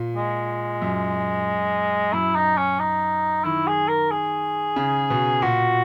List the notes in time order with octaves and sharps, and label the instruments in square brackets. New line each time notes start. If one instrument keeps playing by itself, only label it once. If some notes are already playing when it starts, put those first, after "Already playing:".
Already playing: [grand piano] A#2
[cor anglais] G#3
[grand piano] F#2
[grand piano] F#2 [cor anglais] E4
[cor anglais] D#4
C#4
D#4
[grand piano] D#3 [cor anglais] E4
[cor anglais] G#4
A#4
G#4
[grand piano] C#3
B2
[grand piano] A#2 [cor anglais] F#4